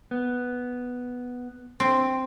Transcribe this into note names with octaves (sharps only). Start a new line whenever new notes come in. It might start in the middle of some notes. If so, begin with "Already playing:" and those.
B3
C4